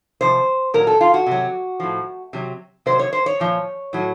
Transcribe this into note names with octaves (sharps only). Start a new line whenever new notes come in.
C3 F3 C5
A#2 F#3 A#4
A4
F4
F#4
C3 F#3
A2 F3
C3 F#3
C3 F#3 C5
C#5
C5
C#5
A#2 F3
A2 F#3